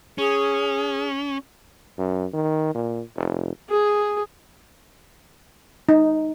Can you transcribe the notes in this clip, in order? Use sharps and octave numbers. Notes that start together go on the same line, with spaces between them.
C#4 G#4
F#2
D#3
A#2
F1
G#4
D#4